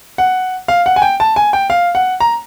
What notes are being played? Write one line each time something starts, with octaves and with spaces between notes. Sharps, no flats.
F#5
F5
F#5
G#5
G5
A5
G#5
G5
F5
F#5
A#5